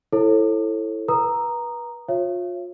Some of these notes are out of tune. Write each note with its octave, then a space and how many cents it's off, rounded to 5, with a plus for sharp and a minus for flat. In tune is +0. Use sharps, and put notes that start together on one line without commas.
E4 +5 A4 +0 C#5 -40
B4 -30 A#5 +0 D#6 -15
F4 +35 C#5 -30 E5 +45